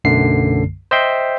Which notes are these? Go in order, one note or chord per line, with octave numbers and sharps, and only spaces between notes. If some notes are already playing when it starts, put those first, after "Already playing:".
B1 F#2 D3 A3 C7
C5 D#5 E5 G5 C6